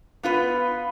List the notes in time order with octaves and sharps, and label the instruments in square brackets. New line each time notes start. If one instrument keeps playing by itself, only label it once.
[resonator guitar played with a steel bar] B3 F4 B4